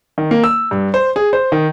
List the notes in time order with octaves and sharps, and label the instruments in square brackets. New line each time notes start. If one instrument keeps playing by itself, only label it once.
[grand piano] D#3
A#3
E6
G2
C5
G#4
C5
D#3